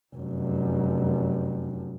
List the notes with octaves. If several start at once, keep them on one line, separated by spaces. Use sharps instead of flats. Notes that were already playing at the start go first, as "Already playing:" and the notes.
F1 F#2